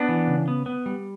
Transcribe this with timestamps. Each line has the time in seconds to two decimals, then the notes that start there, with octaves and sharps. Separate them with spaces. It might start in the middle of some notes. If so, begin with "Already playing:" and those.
Already playing: B3 D4
0.09 E3
0.27 C#3
0.48 B3
0.66 B3
0.86 G3